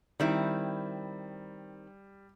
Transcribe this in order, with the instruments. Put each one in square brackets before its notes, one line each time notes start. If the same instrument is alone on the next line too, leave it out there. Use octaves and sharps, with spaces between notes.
[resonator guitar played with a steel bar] D#3 C4 E4 [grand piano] G3